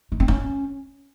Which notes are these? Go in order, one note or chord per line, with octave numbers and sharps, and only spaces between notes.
D#4
C4
C#4